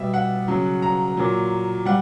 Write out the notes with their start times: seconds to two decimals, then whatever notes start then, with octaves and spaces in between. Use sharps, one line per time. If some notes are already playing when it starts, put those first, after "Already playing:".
Already playing: B2 G3 E5
0.14 F#5
0.48 C#3 F#3
0.82 A#5
1.17 A#2 F#3
1.86 G3 F#5